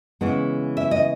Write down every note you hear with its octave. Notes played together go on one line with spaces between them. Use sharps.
C#3 E3 G#3 B3 F#5
E5
D#5